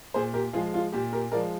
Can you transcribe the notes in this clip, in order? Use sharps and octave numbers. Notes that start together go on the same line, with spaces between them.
A#2 G#4 C5
G4 A#4
F3 G#3 F4 G#4
F4
A#2 G4
G4 A#4
F3 G#3 A#4 D5